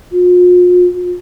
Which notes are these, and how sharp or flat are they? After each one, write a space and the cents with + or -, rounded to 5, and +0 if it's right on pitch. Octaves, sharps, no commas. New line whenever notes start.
F4 +40